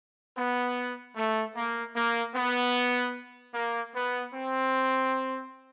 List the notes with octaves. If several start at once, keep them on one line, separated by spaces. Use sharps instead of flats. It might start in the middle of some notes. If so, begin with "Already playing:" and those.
B3
A3
A#3
A#3
B3
A#3
B3
C4